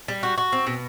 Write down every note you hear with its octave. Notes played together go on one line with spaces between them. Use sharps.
G3
F#4
F#4
C4
B2